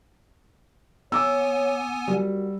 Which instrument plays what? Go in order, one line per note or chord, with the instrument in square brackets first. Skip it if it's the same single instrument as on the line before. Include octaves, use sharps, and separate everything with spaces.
[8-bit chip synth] B3 G#5 [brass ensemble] C#5 [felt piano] D6 E6
[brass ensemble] F#1 F#4 A#4 [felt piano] G3